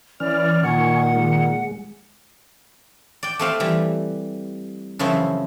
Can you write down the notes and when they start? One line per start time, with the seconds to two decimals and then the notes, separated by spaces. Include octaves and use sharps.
0.20 E3 C#4 D5 F6
0.63 A#2 D#3 F#5 G#5 C#6
1.15 G#3
3.23 D5 G5
3.39 A3 C4 F5 G5
3.60 E3 G3
4.99 F#2 C#3 E3 F3 C4 E4